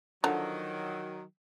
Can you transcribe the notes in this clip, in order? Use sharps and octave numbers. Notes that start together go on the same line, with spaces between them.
D3 D#3 F3 F#3